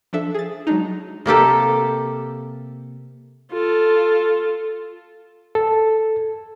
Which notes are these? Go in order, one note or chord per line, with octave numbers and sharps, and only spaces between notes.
F3 D4 A4 E5
G#4 A6
F#3 G#3 D4 D#4
C3 A#3 G4 A4
F4 A4
A4